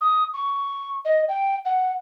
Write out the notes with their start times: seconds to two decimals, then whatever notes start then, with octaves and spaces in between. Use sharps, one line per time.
0.01 D#6
0.34 C#6
1.05 D#5
1.28 G5
1.65 F#5